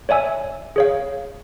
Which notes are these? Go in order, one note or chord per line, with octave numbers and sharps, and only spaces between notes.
C#5 D5 E5 G#5 E6
G#4 C#5 F5